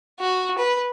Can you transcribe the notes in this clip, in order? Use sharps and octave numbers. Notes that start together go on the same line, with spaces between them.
F#4
B4